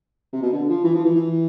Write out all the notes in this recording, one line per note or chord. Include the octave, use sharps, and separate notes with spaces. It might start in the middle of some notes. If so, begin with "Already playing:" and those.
C3
B2
D3
F3
E3
F3
E3
E3